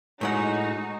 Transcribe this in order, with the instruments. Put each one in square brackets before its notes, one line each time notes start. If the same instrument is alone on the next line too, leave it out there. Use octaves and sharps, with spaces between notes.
[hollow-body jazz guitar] A2 G#3 F#5 [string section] D#4 F#4